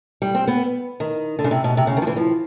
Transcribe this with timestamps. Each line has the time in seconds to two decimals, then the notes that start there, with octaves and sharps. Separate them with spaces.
0.22 G3
0.35 C4
0.48 B3
1.00 D#3
1.39 D3
1.44 C#3
1.51 C3
1.64 B2
1.77 C3
1.87 C#3
1.97 D#3
2.02 F3
2.07 E3
2.16 F3